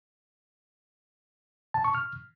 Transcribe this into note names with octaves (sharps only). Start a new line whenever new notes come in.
A5
C#6
F6